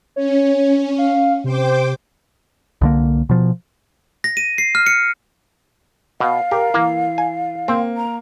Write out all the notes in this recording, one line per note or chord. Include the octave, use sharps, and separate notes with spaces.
C#4 C#5
F5
C3 C5 G5 D6
C2 D3 A#3
B2 F3
A#6
D#7
C7
F6
C#7
B2 F5
G4 A#4
E3 A#3
G#5
A#3 C4
A#5